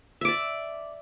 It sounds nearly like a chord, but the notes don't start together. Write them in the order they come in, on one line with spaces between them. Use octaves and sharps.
E5 D6 D5